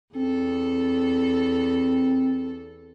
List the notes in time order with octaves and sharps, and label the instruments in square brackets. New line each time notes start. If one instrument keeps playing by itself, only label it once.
[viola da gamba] E2 A4 [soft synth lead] C4